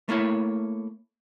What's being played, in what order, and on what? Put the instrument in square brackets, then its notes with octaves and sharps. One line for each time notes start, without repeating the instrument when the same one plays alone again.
[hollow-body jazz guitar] A3 A#3 E4 C#5